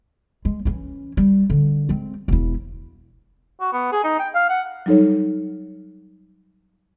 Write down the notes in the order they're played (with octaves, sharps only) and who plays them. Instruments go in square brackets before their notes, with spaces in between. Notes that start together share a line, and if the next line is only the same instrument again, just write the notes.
[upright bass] G#3
E3 C#4
G3
D3
G#3 C4
E1 E4
[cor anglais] F#4
B3
G#4
D#4
G5
F5
F#5
[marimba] F#3 G3 D#4 A4 C#5